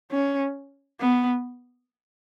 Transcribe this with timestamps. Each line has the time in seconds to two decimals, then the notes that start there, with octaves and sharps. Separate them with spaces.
0.11 C#4
1.00 B3